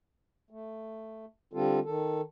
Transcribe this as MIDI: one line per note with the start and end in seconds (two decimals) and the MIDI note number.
0.51 1.25 57
1.53 1.79 50
1.53 1.79 55
1.53 1.79 60
1.53 1.79 65
1.53 1.79 69
1.85 2.21 51
1.85 2.21 69